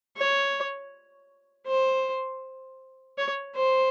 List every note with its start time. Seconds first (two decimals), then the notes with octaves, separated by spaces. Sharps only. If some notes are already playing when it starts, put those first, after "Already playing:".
0.17 C#5
1.67 C5
3.18 C#5
3.56 C5